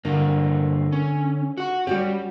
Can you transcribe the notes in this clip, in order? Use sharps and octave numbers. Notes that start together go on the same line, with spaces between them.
G2 D3 A#3
C#4
F#4 F#5
G3 C#4 F#4 G4